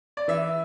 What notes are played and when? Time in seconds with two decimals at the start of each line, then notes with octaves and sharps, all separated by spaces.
0.17 D5
0.28 E3 E5